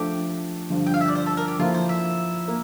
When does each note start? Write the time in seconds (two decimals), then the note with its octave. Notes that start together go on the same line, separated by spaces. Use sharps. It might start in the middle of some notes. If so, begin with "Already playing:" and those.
Already playing: F3 A3 D4 G4 A4
0.70 G2 D3 F3
0.86 G5
0.94 F5
1.01 E5
1.08 D5
1.15 C5
1.26 A4
1.37 A#4
1.48 G4
1.59 F3 A#3 E4 F4 A4
1.74 C5
1.89 E5
2.48 A#3